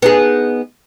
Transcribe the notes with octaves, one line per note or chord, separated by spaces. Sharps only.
B3 D#4 G#4